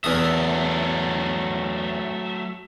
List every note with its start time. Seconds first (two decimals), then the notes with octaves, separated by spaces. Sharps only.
0.04 E2 F#3 A3 E5 D#6